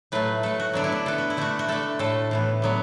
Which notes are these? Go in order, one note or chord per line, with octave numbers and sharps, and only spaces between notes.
A2 F#3 A3 B4
A2 A3 A4
F#4
D3 F#3 B3 D4
E4
D4
D3 B3 A4
F#4
E4
D3 A3 F#4
F#4
D3 A3 A4
A2 A3 A4
A2 E3 B3
D3 F#3 B3